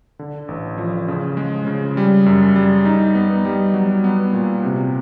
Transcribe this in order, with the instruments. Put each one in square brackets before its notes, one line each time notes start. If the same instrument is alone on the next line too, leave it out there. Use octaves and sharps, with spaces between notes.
[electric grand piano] D3
A1
F3
C#3
G#3
C#3
G3
F#2
G3
D#4
B3
G3
F#3
B3
A#2
C3